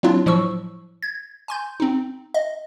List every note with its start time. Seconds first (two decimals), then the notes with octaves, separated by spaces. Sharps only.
0.03 F#3 A#3 C4 D4 E4 F4
0.26 A2 F3 F#3 C#6 E6
1.02 G#6
1.48 G#5 C6 G6
1.80 C4 D#4
2.34 D#5